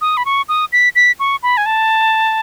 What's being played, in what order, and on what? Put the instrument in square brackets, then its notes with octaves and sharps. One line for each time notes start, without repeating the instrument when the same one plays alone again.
[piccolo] D#6
B5
C#6
D#6
B6
B6
C#6
B5
G#5
A5